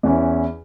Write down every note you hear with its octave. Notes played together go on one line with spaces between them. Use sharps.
E2 E3 C#4 E4